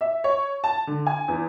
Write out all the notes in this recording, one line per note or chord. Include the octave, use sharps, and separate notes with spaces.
E5
C#5
A5
D3
G#5
E2